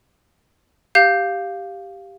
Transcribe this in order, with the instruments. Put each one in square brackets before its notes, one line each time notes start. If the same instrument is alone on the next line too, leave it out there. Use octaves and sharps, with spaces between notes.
[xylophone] G4 F5 G6